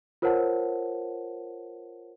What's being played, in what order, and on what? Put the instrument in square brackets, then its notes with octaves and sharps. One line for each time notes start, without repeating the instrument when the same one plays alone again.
[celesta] F4 A#4 C5 C#5 F#5 A5